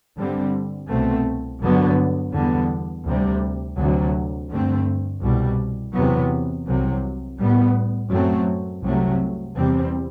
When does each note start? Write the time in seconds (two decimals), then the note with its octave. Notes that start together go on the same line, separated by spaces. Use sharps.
0.16 G2 D3 G3 C4
0.88 C2 B2 A3 C4
1.60 G2 D3 F#3 B3
2.33 E2 D3 G3 B3
3.05 D2 C3 G3
3.77 D2 C3 F#3
4.50 G2 D3 A3 C4
5.22 C2 B2 G3
5.94 E2 C3 F#3 B3
6.67 C2 C3 F#3
7.39 A2 G3 B3
8.11 F#2 F#3 A3 C4
8.83 C2 C3 F#3 A3
9.56 E2 C3 G3 C4